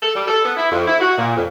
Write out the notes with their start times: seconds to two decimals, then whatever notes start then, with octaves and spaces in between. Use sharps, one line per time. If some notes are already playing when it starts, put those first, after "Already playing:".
0.03 A4
0.14 G3
0.28 A4
0.45 B3
0.56 E4
0.70 F2
0.87 E4
1.01 F#4
1.17 A#2
1.37 F2